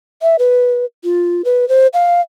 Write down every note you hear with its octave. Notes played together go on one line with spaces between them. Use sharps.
E5
B4
F4
B4
C5
F5